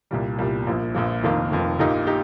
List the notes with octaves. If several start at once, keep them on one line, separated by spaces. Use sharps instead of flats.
C2 A#2 G3
C2 A#2 G3
A#1 A#2 F3
A#1 A#2 F3
F1 F2 D#3 A#3 F4
F1 F2 D#3 A#3 F4
A#1 A#2 A#3 D#4 G4
D#4 G4